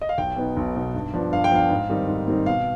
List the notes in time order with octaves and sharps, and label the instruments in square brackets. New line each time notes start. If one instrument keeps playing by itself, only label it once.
[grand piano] D#5
F5
B1 G5
B2 B3 D#4
B1
B2 B3 D#4
G2
F3 B3 D4
G2 F5
G5
F3 B3 D4 F5
G#2
D#3 G3 C4 D#4
G#2
D#3 G3 C4 D#4
B2 F5